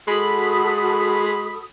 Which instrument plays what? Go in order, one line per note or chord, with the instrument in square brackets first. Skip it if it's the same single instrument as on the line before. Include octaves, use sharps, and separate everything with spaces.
[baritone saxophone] G#3 [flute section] F#4 A4 D#6 [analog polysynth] B5